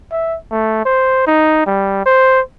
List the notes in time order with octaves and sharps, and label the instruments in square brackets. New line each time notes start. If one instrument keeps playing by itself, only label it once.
[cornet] E5
A3
C5
D#4
G3
C5